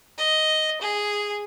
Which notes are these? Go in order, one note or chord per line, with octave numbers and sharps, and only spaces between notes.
D#5
G#4